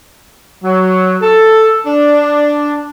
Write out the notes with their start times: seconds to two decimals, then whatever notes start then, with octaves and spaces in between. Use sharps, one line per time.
0.63 F#3
1.22 A4
1.86 D4